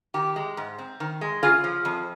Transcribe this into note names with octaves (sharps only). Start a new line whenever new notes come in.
D#3 G4
G#3
G#2
C4
D#3
G#3
C#3 F4 G#4
F3
F2